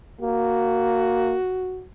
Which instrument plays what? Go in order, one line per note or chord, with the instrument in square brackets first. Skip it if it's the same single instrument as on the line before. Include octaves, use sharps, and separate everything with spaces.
[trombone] A#3 [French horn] F#4